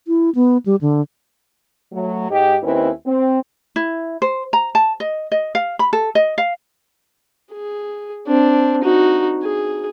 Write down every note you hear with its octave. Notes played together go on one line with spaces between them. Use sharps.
E4
B3
G3
D3
F#3 A3
G#2 G4 D#5
D#2 D#3 C4 C#4 E4 B4
C4
E4
C5
A#5
A5
D#5
D#5
F5
B5
A4
D#5
F5
G#4
C4 D4
D#4 F#4
G#4